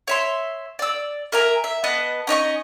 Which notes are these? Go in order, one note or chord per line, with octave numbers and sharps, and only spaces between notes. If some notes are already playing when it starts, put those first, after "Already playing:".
C#5 E5 C6
D5 E6
A#4 E5 G#5 A#5
E5
B3 D#5 A5 F#6
C#4 D#4 D#5 C#6